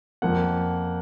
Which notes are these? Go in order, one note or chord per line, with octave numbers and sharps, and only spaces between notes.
F2 F3 A#3 F#5